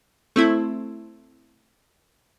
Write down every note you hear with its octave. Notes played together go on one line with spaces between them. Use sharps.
A3 C4 E4